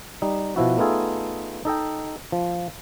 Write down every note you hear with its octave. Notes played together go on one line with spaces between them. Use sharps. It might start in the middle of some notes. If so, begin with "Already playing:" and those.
G3 D#4
B2 F3 E4 F#4
A3 B3 D#4 F4 G#4 A4
D#4 A4 D#5 G5
F3